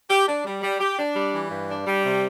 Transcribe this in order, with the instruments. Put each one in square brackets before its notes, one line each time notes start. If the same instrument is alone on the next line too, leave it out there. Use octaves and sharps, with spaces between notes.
[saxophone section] G4
D4
G3
G3
G4
D4
G3
E3
G2
D4
G3
C3